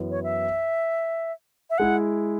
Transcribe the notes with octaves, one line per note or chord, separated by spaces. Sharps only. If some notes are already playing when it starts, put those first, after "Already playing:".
Already playing: F#2 E3 B3
C#5
E5
E5
G#3 E4 F#5